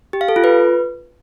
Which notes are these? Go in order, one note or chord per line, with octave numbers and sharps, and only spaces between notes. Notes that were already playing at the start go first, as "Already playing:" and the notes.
G4
F5
A4
F4
B4